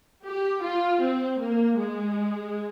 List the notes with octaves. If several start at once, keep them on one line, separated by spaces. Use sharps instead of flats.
G4
F4
C4
A#3
G#3